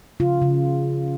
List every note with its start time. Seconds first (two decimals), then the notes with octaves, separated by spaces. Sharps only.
0.20 C#3 F4
0.42 C#3